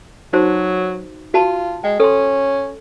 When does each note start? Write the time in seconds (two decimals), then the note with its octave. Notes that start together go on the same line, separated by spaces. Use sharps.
0.33 F#3 D#4 F#4 C5
1.34 F4 F#4 A5
1.84 G#3 G5
2.00 C#4 A4 C6